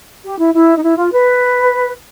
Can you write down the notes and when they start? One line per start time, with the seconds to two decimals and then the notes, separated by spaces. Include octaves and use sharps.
0.25 G4
0.39 E4
0.54 E4
0.77 D#4
0.83 E4
0.98 F4
1.12 B4